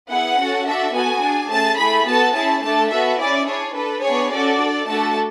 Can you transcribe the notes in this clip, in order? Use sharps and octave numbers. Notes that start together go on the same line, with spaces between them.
B3 E4 G#4 F#5
C#4 F#4 A4
D4 F#4 A4 E5
B3 F#4 A4 G#5
D4 G#4
A3 C#4 G#4 A5
A3 E4 G#4 B5
B3 F#4 A4 A5
C#4 E4 G#4 A5
A3 D4 A4 A5
B3 F#4 A4 E5
C#4 E4 G#4 D5
D4 G#4 C#5
D4 A4 B4
B3 D4 G#4 C#5
C#4 F#4 A4 D5
D4 A4
A3 D4 F#4 A4 A5